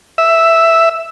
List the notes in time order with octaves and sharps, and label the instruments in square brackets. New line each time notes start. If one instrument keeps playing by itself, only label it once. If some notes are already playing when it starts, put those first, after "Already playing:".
[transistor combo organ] E5